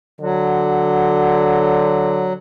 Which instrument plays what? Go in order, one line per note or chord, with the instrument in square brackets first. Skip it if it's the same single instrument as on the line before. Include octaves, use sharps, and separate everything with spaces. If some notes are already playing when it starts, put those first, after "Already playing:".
[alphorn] D3 [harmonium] F#3